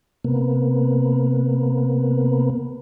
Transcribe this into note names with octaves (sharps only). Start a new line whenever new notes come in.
C3 A#3 B3